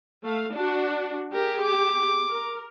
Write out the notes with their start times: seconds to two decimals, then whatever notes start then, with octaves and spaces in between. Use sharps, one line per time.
0.23 A3 F5
0.54 D4 F#4
1.33 G4 G#4 A#4
1.62 D6
2.29 A#4